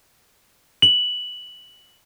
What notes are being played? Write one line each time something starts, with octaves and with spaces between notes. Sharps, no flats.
F#7